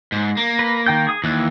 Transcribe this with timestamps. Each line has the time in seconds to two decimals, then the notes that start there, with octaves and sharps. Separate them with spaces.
0.12 G#2
0.37 A#3
0.59 B4
0.87 D#3 G5 G6
1.07 G#4 D#6
1.24 D#2 E3 F#6